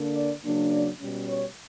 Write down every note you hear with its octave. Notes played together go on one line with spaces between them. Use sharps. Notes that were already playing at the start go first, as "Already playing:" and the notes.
Already playing: D3 A#3 D4
D5
C#3 F#3 A#3 D4
D5
B2 G3 C#4
C#5